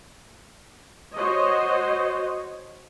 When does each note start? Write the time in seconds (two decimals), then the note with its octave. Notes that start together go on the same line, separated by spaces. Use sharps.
1.16 F#4 C5 C#5 D#5